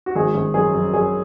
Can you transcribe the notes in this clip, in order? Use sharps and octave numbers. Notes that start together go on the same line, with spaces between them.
F#4
G#1 G#4
G#1
F#2 G#4
F#2
F#2 G#4